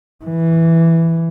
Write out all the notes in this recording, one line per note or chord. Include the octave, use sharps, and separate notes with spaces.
E3